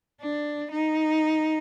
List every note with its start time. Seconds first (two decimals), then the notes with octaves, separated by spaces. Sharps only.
0.21 D4
0.71 D#4